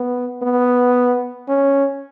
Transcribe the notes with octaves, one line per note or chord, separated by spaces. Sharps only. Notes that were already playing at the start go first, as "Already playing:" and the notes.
Already playing: B3
B3
C#4